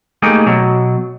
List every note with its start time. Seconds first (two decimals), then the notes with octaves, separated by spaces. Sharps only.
0.22 A3 A#3 D#4 G4 G#4
0.47 B2 F#3